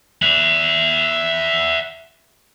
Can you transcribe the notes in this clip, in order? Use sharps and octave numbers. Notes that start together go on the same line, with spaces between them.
E5 F#5